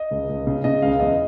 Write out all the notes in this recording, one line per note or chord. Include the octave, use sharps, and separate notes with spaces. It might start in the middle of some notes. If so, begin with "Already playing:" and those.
Already playing: D#5
C#2
C#2
C#3
C#3 D#5
C#2 F5
E2 D#5